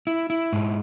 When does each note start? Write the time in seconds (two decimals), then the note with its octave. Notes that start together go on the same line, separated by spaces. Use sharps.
0.07 E4
0.30 E4
0.52 G#2